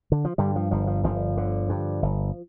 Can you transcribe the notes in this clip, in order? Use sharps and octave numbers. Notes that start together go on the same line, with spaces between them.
D3
F3
G2 D3 G3
F3
G1 F3
F3
G1 F3
D3
G2
G1